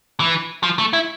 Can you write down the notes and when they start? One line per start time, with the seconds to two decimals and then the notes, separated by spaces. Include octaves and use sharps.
0.20 E3
0.63 F3
0.79 A3
0.93 E4